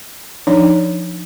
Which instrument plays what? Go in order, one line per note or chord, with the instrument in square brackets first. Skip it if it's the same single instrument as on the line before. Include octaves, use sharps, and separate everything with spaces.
[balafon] F3 D4 D#4 C#5 D5